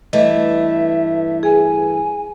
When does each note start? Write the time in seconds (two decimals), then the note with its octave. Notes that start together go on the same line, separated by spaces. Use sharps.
0.13 G2 E3 A3 D#5 E5
1.43 G#4 G#5